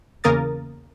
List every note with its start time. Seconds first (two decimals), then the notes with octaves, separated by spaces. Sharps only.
0.24 E2 C#3 A#3 A#4 D#6 A6